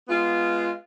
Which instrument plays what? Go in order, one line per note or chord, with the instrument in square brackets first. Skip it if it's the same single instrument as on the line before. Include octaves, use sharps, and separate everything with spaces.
[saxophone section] G#3 B3 F4